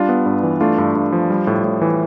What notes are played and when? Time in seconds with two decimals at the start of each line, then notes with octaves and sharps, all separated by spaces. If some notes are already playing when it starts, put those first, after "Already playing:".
Already playing: G3 D4 F4
0.09 B3
0.26 G2
0.43 E3
0.61 A3 D4 F4
0.78 G2
0.95 G2
1.12 F3
1.30 G3
1.47 A2
1.64 A2
1.81 E3